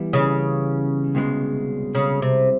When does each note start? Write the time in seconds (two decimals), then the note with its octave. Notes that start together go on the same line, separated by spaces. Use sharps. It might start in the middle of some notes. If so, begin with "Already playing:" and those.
Already playing: E3 G3 B3 E4
0.13 C#3
1.15 C2 B2 G#3
1.95 C#3
2.22 C3